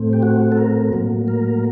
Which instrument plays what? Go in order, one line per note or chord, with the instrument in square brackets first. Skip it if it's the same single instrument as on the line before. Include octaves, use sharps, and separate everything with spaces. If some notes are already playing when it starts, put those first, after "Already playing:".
Already playing: [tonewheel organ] A2 A3 C4
G4
F#4
A4
A#4
A2 F#3 A#3
A#4